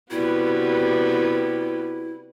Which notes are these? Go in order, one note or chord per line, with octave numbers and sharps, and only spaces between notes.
C3 G3 B3 E4 F#4 B4